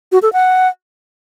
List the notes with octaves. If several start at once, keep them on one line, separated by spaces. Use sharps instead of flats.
F#4
A4
F#5